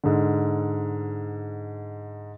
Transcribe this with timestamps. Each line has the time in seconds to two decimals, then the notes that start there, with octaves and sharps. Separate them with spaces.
0.03 G#2 D3